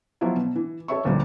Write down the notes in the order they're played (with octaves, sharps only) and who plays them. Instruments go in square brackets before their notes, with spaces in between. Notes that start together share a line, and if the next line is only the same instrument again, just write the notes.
[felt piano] F3 F#3 B3 E4 F4
B2
E3
A4 C#5 E5 C#6
D2 A#2 F3 G3